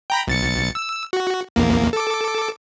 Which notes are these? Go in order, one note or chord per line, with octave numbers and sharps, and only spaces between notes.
G5 A#5 B5
B1 A6 C#7
E6
F#4
A#1 E2 A#3
A4 D6